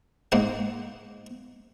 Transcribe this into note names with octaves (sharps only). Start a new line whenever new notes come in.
G#2 A#3 F#5